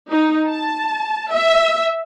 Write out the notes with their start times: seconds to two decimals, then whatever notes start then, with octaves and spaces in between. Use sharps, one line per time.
0.12 D#4
0.49 A5
1.32 E5